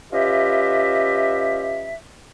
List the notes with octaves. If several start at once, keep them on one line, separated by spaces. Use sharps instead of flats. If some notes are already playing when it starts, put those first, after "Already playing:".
C#4 F4 G4 B4 D#5 E5